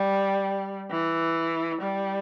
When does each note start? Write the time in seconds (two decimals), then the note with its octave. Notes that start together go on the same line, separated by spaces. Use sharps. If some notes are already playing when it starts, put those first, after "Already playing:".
Already playing: G3
0.90 E3
1.81 G3